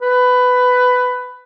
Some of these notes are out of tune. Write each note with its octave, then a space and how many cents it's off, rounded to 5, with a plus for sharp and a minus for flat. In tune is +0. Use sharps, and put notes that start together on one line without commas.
B4 +15